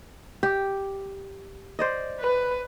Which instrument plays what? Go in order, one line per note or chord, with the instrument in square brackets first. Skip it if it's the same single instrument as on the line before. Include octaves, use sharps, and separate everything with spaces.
[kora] G4
C5 D5 D#5
[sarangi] B4